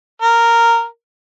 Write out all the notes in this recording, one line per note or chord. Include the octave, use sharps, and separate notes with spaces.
A#4